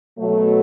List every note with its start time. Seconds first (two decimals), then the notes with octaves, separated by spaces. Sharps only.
0.18 B2 F#3 A3